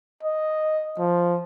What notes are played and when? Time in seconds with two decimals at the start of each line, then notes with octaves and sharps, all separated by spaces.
0.23 D#5
0.99 F3